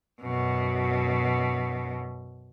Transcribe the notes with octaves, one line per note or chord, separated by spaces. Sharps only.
F#2 B2